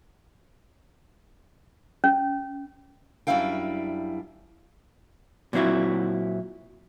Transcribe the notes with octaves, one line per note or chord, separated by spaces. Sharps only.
C#4
F#2 G3 D4 E4 F5 G5
A#2 F#3 C4 E4 F#4